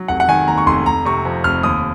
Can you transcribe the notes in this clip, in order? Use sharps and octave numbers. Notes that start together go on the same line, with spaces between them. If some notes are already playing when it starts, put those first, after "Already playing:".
Already playing: F#3
F1 F#5
F#5
D#3 G#5
D#2 A#5
C#6
F1 C6
F1 A#5
C3 C#6
F2
F1 F6
D#2 D#6